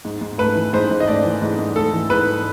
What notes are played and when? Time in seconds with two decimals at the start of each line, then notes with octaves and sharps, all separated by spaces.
0.05 G#2
0.21 G#2
0.38 A3 B4
0.55 E3
0.73 G#2 C5
0.91 G#2
1.00 D#5
1.07 A3 D5
1.25 E3
1.42 G#2
1.59 G#2
1.76 A3 A4
1.93 E3
2.10 G#2 B4